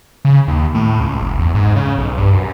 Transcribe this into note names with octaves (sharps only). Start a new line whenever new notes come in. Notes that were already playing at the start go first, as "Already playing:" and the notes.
C#3
D#2
A2
C#2
F#1
E2
G#2
C#3
B1
G2
F#2